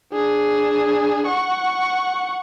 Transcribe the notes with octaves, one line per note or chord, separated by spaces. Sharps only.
D4 G#4
F#5 C#6